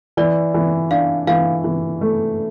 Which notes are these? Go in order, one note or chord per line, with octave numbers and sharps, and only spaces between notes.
E3 D5
E3
D4 F5
E3 F5
E3
A3